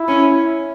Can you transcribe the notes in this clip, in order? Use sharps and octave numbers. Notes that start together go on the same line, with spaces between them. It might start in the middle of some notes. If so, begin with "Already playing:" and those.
Already playing: E4
C#4